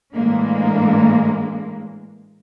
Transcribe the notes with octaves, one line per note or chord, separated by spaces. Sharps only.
A2 E3 G#3 A#3 D4